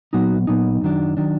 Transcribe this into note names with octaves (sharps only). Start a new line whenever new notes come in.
A#2 F#3 B3 D#4 F#4
A#2 F#3 B3 D#4
F#2 D#3 F#3 D4
D#3 F#3 D4